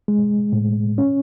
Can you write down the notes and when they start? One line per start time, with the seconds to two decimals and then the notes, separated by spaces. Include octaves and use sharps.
0.08 G#3
0.53 A2
0.98 C#4